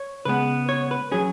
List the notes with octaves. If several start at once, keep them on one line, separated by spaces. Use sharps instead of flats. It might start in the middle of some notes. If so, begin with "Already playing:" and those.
Already playing: C#5
C#3 G#3 B3 B4
C#5
B4
F#3 C#4 G#4